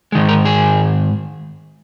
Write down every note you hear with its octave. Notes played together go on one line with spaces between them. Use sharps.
G#2 D#3 G#3
A#4
G#4